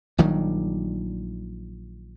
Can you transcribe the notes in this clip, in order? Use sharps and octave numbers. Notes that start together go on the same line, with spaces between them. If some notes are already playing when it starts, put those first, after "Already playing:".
A#1 D#3 F#3 G3